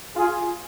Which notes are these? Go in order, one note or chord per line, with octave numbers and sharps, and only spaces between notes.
F4 G#4